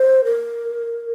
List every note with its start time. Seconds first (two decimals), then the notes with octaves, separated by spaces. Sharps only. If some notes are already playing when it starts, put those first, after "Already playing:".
Already playing: C5
0.25 A#4